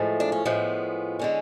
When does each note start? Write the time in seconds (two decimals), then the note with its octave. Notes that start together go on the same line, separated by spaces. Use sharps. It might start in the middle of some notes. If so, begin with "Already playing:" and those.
Already playing: A2 F3 G#3 A3
0.20 D4
0.32 C#4
0.45 A2 F3 G#3 B3
1.19 D3 G#3 C#4